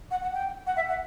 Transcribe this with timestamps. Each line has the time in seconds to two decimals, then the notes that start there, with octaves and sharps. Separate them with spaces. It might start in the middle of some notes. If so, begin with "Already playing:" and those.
0.11 F#5
0.22 F#5
0.33 G5
0.67 F#5
0.77 E5
0.88 F#5